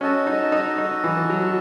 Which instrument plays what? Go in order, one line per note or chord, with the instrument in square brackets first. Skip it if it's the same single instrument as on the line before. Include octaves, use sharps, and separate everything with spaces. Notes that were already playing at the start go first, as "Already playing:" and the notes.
[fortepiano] C#4 [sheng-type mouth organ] F#4 A4 D#5 A5
[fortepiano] D#4
D#4
D#4
E3
E3
F#3
F#3